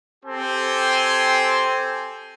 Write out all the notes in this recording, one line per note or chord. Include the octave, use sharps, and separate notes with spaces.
C4 G4 A4 G#5 C6